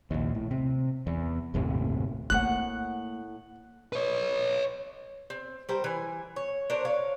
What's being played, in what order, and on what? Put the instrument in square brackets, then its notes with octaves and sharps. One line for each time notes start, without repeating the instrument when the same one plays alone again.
[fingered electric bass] A#1 D#2
A2
C3
E2
G1 D#2 A2 C3
[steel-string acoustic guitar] A2 F#5 [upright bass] A3 A#3 [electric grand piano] F#6
[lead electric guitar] B4 C#5
[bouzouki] C4
G3 A#4 C5 G5
E3 G#5
C#5
D4 A#4 C5 C#5
C#5 F5